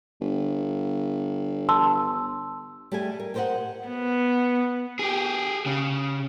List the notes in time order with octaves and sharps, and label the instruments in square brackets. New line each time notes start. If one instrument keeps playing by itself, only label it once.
[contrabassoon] G1
[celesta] A5 C6 E6
[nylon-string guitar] G3 A3 G4 G#4 D#5 G#5
A#4
G4 A#4 C5 C#5 D#5 F#5
[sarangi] B3
[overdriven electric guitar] G4 G#4
C#3